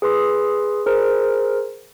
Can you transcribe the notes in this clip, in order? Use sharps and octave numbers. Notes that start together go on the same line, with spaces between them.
G#4 B4 C6 D#6
G#4 A#4 C5